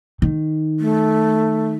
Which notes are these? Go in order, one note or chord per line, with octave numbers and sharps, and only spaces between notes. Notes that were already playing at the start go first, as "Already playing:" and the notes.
D#3
A3